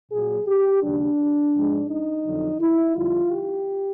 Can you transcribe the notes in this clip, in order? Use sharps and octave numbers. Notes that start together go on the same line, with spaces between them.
A#2 F#3 G#4
G4
D#2 C#3 F#3 D4
G#2 F3 G#3
D#4
F2 D3 F#3
E4
F2 D3 G3 F4
G4